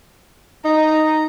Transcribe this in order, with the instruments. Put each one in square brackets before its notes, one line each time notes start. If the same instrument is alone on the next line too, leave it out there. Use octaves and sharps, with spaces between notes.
[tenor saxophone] D#4 [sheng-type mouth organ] A#5